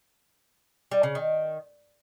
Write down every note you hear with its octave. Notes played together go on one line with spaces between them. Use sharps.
G3
C#3
D#3